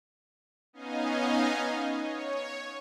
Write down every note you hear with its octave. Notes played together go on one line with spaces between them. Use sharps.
B3 C#4 D#4 D#5 F5 G#5
C#5